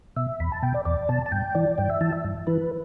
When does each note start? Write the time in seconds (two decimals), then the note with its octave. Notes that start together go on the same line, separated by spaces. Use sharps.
0.16 B2 E5
0.40 E2 B5
0.52 A5
0.63 B2 G5
0.74 D5
0.85 E2 D5
1.09 B2 A5
1.26 A5
1.32 G2 G5
1.55 E3 D5
1.78 G2 G5
1.90 E5
2.01 E3 A5
2.12 E5
2.24 G2
2.47 E3 B4